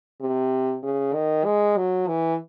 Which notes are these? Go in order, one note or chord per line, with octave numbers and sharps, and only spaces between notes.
C3
C#3
D#3
G#3
F#3
E3